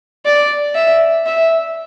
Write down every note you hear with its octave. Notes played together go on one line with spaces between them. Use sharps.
D5
E5
E5